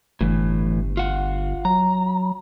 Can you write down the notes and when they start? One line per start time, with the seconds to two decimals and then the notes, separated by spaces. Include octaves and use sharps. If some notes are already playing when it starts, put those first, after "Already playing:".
0.21 G1 A2 E3
0.97 F4 F#5
1.65 F#3 A#5